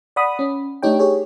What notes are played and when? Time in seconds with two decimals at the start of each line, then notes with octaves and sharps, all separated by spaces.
0.16 D5 F#5 B5 D#6
0.39 C#4
0.82 A3 D4 D#4 G4 C#5 G5
0.99 G4 G#4 C#5